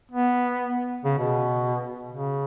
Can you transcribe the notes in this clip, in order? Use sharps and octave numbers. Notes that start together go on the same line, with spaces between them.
B3
C#3
B2
C#3